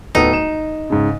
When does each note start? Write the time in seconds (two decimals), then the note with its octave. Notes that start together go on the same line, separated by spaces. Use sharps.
0.15 D1 B3 D#4 A4
0.33 E7
0.90 G#2 C#3